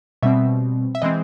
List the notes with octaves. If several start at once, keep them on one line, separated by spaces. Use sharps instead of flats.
B2 G3 C4 E5
E5
E3 G#3 C4 D#5